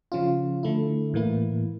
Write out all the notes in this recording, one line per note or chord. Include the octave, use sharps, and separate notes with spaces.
C#3 F3 C#4 F4
D3 A3 E4
A2 E3 A#3 E4